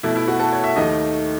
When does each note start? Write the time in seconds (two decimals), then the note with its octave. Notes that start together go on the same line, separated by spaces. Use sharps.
0.03 B2 A3 E4
0.16 E4
0.28 F#4
0.40 A4
0.52 C#5
0.64 E5
0.76 D#2 D#3 A3 D#5